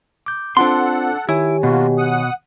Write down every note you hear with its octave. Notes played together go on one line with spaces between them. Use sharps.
D6 G6
C4 D4 F4 A4 C5 F#5 C6
D#3 E4 G4 C#5 G#5
B2 A#3 F4 F#4
F#5 D#6